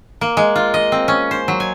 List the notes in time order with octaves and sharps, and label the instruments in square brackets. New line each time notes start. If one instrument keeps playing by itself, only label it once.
[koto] A#3
G#3
F4
D#5
C4
C#4
C5
F#3
G#5